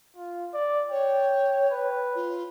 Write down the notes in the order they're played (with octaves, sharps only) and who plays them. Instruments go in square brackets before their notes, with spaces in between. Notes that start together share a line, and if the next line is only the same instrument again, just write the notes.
[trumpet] F4
D5
[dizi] C#5 [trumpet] G5
[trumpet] B4
[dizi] F4